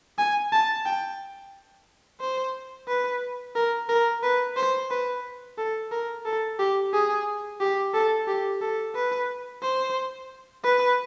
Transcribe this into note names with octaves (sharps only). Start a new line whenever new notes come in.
G#5
A5
G5
C5
B4
A#4
A#4
B4
C5
B4
A4
A#4
A4
G4
G#4
G4
A4
G4
A4
B4
C5
B4